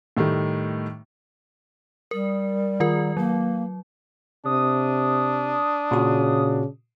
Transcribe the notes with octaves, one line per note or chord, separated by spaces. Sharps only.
A2 D#3 G3 A3
G3 A#4
D#3 F4 A#4
F#3 A#3
C3 D4 D#6
A#2 C#3 F#4